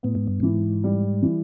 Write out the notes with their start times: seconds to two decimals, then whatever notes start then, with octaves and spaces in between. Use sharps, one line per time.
0.03 A2 B3
0.15 G#2
0.27 G2
0.40 G#2 E3
0.84 G3
1.22 E3